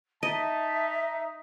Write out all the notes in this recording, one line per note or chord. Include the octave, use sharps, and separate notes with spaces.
D#4 D#5 E5 A5